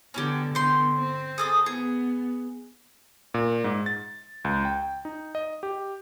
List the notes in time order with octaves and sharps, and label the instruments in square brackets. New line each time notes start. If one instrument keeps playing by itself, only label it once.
[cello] D3 B3 [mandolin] C#4 E4 G4
[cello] D3 B3 [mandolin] G5 C6
[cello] C4
[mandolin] G#4 A4 D#6
[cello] B3 [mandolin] G#4
[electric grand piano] A#2
G#2
A6
C#2
G5
D#4
D#5
G4